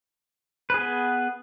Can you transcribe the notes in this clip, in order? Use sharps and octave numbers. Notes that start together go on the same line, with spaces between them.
B3 G#4 B4